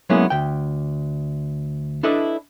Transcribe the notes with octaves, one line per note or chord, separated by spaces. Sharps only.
F#3 G#3 A#3 B3 C#4 E4
D2 G5
D4 E4 A4 B4 D5 D#5